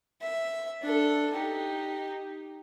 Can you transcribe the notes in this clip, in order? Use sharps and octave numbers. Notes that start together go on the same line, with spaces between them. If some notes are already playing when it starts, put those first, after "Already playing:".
E5
D4 A4
D#4 G4